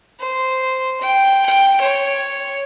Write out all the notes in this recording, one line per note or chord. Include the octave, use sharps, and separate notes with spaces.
C5
G5
G5
C#5